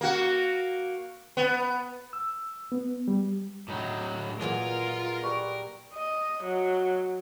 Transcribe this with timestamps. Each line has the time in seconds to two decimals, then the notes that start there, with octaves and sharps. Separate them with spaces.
0.01 A#3 F#4
1.37 B3
2.13 E6
2.72 B3
3.08 G3
3.68 A2 F#3 D#4
4.41 A#2 E3 F#3 F4 G#4 A#4
5.23 G3 B4 C#6
5.94 D#5
6.44 F#3